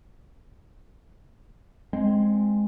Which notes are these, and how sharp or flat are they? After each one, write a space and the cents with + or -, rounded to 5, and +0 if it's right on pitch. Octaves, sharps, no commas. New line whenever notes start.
G#3 +0 C4 +10